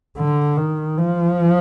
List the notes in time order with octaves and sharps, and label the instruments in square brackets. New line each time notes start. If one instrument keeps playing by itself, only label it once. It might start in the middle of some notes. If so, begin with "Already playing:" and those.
[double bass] D3
D#3
F3